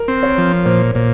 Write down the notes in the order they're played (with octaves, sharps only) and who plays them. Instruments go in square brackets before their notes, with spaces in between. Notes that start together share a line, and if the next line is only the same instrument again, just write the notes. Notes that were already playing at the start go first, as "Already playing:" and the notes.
Already playing: [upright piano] A#4
[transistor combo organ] C4
[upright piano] C#5
[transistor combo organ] F3
[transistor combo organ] A#2 [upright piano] C5
[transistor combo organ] A#2 [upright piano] C5